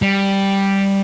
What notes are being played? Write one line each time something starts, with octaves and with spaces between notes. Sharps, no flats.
G3